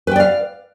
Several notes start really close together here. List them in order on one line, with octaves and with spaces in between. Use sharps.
B4 G5 D5 F5